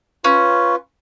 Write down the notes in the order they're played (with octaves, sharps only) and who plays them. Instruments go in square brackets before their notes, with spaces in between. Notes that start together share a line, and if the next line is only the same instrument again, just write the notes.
[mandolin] C#4 [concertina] F4 B4